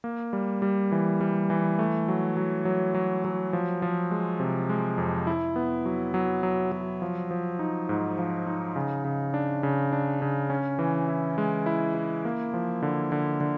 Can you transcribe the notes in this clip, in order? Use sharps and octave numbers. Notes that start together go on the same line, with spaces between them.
A#3
G3
G3
E3
G3
E3
A3
F#3
F#3
F#3
F#3
F#3
F3
F3
G#3
C3
G#3
F2
E4
B3
F#3
F#3
F#3
F#3
F3
F3
D#4
G#2
F3
D#4
C#3
C#3
D4
C#3
D4
C#3
C#4
E3
E4
G#3
E4
E4
A#3
F3
D3
D3
D3